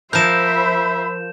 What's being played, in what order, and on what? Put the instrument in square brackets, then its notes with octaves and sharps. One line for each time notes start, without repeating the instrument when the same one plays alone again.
[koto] F3 A#4 [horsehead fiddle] C5 E5 [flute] B5 [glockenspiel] G6 E7